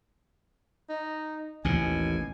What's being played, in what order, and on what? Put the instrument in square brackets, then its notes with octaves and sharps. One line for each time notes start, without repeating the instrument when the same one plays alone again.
[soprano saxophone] D#4
[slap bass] A1 D#2 B2 [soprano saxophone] G#5